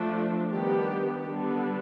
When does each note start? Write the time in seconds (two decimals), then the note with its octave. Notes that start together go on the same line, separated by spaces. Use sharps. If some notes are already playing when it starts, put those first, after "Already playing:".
Already playing: F3 A3 D4
0.51 D#3 G3 B3 D4 G4
1.28 D3 G3 B3 D4